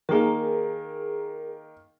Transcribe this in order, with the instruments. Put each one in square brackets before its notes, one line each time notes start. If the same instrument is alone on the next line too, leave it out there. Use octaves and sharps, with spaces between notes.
[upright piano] D#3 A#3 [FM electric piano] G#4 A#4